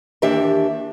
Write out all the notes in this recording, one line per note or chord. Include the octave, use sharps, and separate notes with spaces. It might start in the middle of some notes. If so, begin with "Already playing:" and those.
D#2 E3 D4 G4 E5